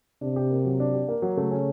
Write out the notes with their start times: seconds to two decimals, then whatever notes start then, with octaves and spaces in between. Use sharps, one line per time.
0.21 C3 D4
0.36 G4
0.51 A#3
0.65 F#3
0.80 D4
0.94 G4
1.08 A#3
1.22 F#3
1.37 C#3 A3
1.51 C#4